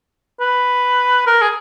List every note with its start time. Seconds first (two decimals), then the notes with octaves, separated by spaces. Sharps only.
0.40 B4
1.27 A#4
1.42 G#4